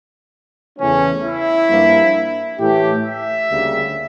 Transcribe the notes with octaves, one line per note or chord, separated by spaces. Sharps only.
E2 C#3 E3 A3 C#4
E4
G2 F3 A#3
A2 E3 A3 G4
E5
D2 C#3 G3 A#3